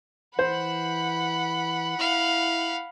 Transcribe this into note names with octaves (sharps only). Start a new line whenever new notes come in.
E3 C5 F#5 B5
E4 F5